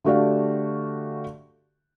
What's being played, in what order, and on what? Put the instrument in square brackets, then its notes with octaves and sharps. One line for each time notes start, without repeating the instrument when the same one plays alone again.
[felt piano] D3 A3 F#4 G4 D5 F5